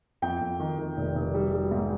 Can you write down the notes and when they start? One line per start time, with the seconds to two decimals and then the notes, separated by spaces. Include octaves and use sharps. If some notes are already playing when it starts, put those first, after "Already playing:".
0.22 F2 G5
0.41 F2
0.60 D#3
0.79 D#3
0.97 F1
1.16 F1
1.34 G3
1.53 G3
1.71 G#2